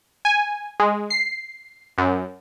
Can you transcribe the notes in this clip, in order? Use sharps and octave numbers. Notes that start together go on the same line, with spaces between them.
G#5
G#3
C7
F#2